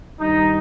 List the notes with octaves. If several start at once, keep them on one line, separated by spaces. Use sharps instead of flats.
G2 D#3 G3 D#4